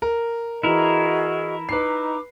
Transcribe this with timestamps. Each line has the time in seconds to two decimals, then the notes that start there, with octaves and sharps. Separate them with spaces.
0.02 A#4
0.63 E3 E4 F#4 G#4 A#4 D#5
1.69 D#4 B4 D6 C7